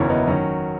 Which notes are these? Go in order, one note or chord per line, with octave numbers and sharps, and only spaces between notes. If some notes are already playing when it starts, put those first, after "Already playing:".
Already playing: F#1 E2 D#3 F#3 C#4 E4
B3 D#4
D#3 F#3 C#4